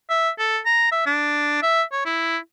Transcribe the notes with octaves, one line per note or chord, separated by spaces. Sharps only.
E5
A4
A#5
E5
D4
E5
C#5
E4